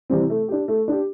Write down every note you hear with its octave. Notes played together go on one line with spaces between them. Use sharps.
C3 E3 G3 C4
A3
D4 G4
A3
D4 G4